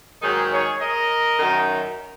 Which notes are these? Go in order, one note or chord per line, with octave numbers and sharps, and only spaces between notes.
G#2 D#3 F#3 D#4 G#4
G#4 C#5
A#4 D#5
F#2 D#3 F#3